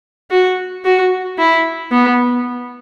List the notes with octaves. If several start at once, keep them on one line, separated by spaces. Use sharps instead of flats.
F#4
F#4
E4
B3